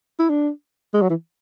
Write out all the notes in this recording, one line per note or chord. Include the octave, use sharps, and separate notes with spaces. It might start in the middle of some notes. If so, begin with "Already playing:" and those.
E4
D4
G#3
F#3
E3